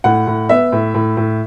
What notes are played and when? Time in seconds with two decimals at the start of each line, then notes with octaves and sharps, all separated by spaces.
0.04 A2 F#5
0.27 A2
0.49 B3 E5
0.72 A2
0.94 A2
1.17 A2